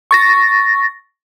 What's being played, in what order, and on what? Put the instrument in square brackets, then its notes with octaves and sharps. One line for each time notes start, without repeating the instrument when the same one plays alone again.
[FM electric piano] C#6 A6 A#6